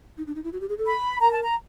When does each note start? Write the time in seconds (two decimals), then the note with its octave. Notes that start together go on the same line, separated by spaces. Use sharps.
0.18 D#4
0.27 D4
0.35 D#4
0.44 E4
0.53 F#4
0.61 G4
0.69 G#4
0.78 A4
0.86 B5
1.20 A#4 A#5
1.32 A5
1.43 A#5